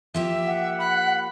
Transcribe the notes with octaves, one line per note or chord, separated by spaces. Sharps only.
F3 A#3 G4 E5
F#5
B5 F#6